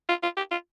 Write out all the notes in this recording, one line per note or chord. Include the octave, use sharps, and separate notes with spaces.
F4
F4
G4
F4